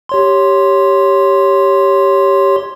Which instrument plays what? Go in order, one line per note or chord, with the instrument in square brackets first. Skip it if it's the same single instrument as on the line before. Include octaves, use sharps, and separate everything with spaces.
[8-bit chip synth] G4 C#5 C6